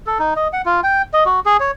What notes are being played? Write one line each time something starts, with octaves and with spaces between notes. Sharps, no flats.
A4
D#4
D#5
F#5
F4
G5
D#5
F#4
G#4
C#5